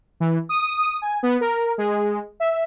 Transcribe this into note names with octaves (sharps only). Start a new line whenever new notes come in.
E3
D#6
G#5
B3
A#4
G#3
E5